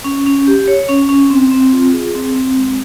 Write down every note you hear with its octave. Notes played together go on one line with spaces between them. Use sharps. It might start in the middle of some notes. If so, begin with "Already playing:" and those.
C#4
C#4
G4
C#5
C#4
C#4
C4
C4
F4
G#4
C4
C4
G#3